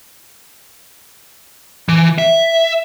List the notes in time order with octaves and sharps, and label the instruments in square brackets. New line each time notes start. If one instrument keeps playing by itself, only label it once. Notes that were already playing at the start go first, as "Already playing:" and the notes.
[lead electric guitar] E3
E5